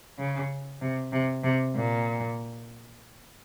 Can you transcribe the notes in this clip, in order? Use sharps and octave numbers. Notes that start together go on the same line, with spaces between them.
C#3
C3
C3
C3
A#2